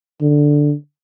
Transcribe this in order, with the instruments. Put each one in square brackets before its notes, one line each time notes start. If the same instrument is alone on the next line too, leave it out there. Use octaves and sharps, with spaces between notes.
[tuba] D3